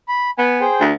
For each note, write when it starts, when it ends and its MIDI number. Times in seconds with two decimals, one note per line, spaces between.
0.08 0.30 83
0.38 0.64 59
0.38 0.59 80
0.61 0.84 68
0.61 0.84 72
0.61 0.84 79
0.80 0.92 38